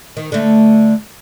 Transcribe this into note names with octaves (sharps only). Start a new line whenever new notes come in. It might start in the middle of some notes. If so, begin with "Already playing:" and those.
D#3
D3 A3